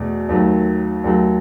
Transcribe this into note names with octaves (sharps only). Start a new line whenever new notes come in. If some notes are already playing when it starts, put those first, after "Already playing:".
Already playing: E2 B2 A3
D#2 D#3 F#3 A3
D#2 D#3 F#3 A3